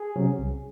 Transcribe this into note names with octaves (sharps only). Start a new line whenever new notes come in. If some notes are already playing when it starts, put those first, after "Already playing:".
Already playing: G#4
C3 F#3 C#4
C2